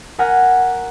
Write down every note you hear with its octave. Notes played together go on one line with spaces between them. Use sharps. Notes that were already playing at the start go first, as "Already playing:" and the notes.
A#4 F#5 G#5 F6 A#6 B6